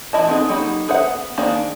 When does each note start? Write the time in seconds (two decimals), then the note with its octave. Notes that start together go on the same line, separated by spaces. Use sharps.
0.13 E3 F#3 E4 D#5 A5
0.27 B3 C4 D#4 G#4
0.49 F#3 A#3 D#4 G4 B5
0.88 G#4 B4 C5 E5 F#5
1.08 B3
1.38 D#3 A#3 D4 G#4 C5